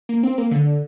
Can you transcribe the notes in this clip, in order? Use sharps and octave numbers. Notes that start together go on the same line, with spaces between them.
A#3
C4
A#3
D3